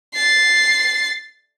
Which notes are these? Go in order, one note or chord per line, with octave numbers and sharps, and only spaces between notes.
A6 C7